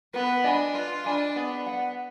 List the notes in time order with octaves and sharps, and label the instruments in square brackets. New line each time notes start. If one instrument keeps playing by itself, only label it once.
[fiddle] B3 [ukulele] B4
[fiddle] D4 [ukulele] D#5 G#5 B5
[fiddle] F4 [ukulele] B4
[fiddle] D4 [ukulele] D#5 G#5 B5
[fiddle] B3 [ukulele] G#4
[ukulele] D5 F#5